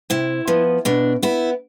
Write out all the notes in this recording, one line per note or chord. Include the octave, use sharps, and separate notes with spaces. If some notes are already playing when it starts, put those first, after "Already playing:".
C3 E4
F3 B3
B2 D4
B3 E4